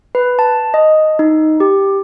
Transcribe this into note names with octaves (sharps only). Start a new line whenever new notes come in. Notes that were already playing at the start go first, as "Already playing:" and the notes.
B4
A5
D#5
D#4
G4